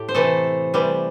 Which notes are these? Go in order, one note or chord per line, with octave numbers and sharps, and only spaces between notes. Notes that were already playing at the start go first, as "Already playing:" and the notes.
Already playing: A2 G4
C5
C3 E3 A3 A4
C3 E3 G3